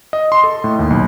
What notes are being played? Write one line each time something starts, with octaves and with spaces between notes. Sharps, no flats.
D#5
C6
A4
A2
D#2
B1